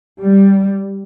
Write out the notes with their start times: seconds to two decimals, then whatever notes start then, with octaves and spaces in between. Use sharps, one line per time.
0.21 G3